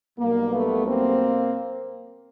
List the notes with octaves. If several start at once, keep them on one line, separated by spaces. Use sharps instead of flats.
B1 B2 G3 A#3
A3 B3
A#3 C4